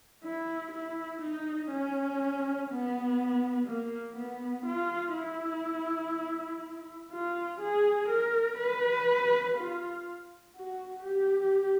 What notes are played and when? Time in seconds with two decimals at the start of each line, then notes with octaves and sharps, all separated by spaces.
0.24 E4
0.72 E4
1.21 D#4
1.71 C#4
2.70 B3
3.67 A#3
4.16 B3
4.66 F4
5.14 E4
7.11 F4
7.61 G#4
8.09 A#4
8.58 B4
9.57 F4
10.56 F#4
11.04 G4